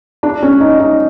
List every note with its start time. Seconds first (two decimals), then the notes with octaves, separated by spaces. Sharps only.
0.23 D4
0.43 C#4
0.60 D#4
0.79 D#4